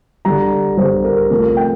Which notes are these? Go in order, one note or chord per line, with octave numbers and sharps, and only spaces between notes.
D3 G3 A#5
D3 G3 C5
A#4
C3 F3 A3 A#4
G5